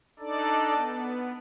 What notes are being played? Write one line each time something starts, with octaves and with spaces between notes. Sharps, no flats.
D4 D#4 A4 D5
B3